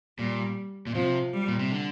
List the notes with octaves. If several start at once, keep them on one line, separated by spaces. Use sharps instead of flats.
A#2 G3
A#2
C3 F3
G3
A#2
C3
D3